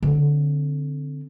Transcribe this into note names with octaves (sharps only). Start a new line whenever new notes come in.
D3 C4